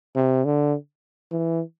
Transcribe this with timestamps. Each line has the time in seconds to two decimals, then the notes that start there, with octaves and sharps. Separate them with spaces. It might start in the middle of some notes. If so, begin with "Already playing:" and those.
0.16 C3
0.45 D3
1.31 E3